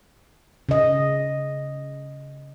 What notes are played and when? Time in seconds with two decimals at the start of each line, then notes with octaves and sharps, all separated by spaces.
0.69 C#3 D#5